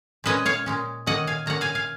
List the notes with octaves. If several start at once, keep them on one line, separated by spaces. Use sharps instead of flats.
A#2 G#3 C#4 B4 D#5
C#5 F5
A#2 G#3 C#4
D#3 A#3 C#4 D#5 F#5
F5 G#5
D#3 A#3 C#4 F#5 A#5
F5 G#5
F5 G#5